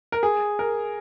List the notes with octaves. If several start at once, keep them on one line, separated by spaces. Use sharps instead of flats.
A#4
G#4
A#4